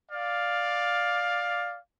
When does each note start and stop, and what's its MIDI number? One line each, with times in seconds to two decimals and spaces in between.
0.11 1.78 74
0.11 1.78 77